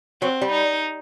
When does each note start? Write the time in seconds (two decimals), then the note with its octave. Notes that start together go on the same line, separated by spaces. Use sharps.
0.22 F#3 C4
0.41 G3
0.52 D#4